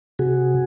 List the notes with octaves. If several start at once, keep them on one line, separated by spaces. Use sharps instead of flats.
C3 F#4 G#4